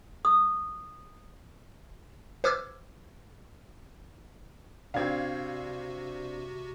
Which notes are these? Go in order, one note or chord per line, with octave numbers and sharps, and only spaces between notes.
D#6
B4 C5 D6 E6 F6 G#6
C3 C4 D4 F#4 F5 G#6